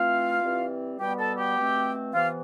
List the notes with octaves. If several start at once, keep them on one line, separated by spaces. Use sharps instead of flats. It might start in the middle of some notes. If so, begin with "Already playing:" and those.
Already playing: E3 A3 C4 F4 F5
E3 G3 C4
B2 G3 B3 G4 G5
A4 A5
G4 G5
B2 A3 C4
C3 E3 B3 F4 F5